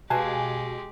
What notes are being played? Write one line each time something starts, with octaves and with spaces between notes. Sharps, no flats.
B2 G#3 G4 B4 F5 G#5 A5